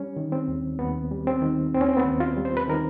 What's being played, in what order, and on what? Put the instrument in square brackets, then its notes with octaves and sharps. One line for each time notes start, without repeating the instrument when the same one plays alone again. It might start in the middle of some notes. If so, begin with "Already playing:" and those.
Already playing: [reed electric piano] G3 C#4
D#3
C4
D#2
D#2 B3
G3
C4
D#3
D#2 C4
C#4
C4
B3
D#2
F4
G3
C5
B4
D#3 A#4